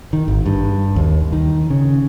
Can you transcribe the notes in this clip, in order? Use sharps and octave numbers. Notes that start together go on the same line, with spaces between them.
D#3
G#1
G2
D#2
D#3
C#3